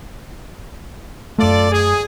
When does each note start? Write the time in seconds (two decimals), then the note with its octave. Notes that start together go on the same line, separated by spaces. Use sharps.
1.38 F#2 A3 F4 A4 D5
1.71 G#4